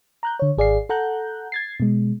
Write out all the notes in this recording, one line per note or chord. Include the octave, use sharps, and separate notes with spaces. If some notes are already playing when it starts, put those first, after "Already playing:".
A#5 F#6 G6
D3 C#5
G#1 G#4 D5 F5 C7
A4 F#5 A#5 F#6 G6
G#6 A6 C7
B2 G#3